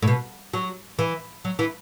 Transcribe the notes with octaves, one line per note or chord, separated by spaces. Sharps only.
A2
B2
F#3
E3
F#3
E3